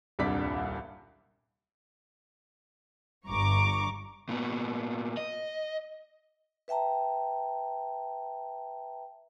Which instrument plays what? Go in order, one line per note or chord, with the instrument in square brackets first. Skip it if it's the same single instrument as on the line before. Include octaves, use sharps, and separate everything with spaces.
[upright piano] D#1 C2 G2 D4 D5 B6
[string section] G1 G2 A#5 C#6 D6
[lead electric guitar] A#2 B3
D#5
[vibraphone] B4 E5 G5 A5 A#5